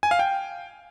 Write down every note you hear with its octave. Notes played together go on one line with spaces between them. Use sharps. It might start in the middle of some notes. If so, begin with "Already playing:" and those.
G#5
F5
G5